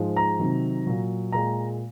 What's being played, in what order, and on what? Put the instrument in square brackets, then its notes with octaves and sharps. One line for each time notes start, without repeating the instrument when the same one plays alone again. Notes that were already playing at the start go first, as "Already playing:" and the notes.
Already playing: [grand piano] G#2 F3 G#3
A#5
C3 D#3 F#3
A#2 F#3
A#2 G#3 A#5